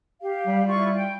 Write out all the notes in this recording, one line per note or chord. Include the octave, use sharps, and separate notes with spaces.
G4 F5
G3
E4 F4 C#6
G5